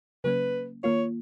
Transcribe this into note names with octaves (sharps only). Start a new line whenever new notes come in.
C#3 F#3 A#3 C#4 B4
D#3 A#3 F4 C#5